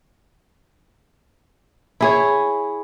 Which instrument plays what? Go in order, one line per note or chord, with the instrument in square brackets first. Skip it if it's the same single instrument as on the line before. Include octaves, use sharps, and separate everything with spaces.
[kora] E4 G#4 C#5